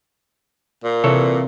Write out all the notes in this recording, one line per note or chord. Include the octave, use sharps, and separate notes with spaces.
A#2
C3 E3 A4 C#5